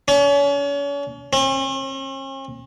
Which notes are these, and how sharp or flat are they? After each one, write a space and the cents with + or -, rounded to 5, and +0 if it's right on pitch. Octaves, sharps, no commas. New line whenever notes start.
C#4 +40
C#4 -45